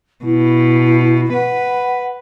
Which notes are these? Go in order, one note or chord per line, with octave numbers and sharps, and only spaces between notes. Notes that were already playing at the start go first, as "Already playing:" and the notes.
B2 E4
B4 F#5